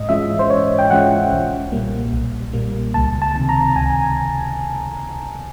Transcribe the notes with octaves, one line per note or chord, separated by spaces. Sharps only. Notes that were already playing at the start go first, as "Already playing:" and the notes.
Already playing: G#2 D#5
E3 G#3 C#4 F4 E5
C5
G#2 C#5
G5
E3 G#3 C#4 F4 F#5
B1
A#2 G3 A#3
B1
A#2 G3 A#3
C#2 A5
A5
C3 D#3
A#5
C#2 G#5